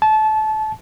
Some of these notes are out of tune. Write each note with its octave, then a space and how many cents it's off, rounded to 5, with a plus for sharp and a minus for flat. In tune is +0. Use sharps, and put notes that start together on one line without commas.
A5 -25